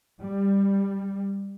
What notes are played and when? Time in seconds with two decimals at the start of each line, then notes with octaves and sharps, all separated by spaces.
0.21 G3